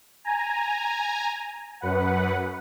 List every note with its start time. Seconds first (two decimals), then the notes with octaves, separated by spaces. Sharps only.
0.24 G#5 A#5
1.81 F#2 B4 F#5